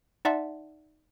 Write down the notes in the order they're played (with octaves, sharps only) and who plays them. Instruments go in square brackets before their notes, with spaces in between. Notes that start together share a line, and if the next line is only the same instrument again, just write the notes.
[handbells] D#4 D5 E5 F#5 A5 C6